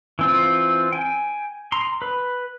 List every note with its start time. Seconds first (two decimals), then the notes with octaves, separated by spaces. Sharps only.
0.19 E3 C4 F4
0.92 G5 G#5
1.72 A#5 C6
2.02 B4